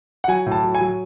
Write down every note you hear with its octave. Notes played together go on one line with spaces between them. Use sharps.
F#5
F#3 G#5
A2
A5
F#3
G#5
F#3